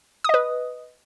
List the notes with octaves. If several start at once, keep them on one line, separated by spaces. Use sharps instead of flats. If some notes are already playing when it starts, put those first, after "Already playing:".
B4 D#5 D#6